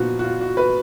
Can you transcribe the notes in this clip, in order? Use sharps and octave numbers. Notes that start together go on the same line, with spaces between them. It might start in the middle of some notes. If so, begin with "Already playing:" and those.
Already playing: A#2 F3 B3 D#4 F4 F#4
F#4
F4
F#4
B4